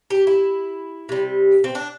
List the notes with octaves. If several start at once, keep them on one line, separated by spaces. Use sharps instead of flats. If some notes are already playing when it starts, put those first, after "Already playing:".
G4
E4
C3 G3
C4
D4